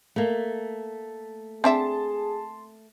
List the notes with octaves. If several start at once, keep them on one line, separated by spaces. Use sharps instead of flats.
A3 A#3
C4 D4 G#4 E5 A5 C6